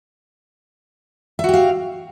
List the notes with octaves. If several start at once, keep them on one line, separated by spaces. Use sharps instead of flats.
F#4 G4 E5 F5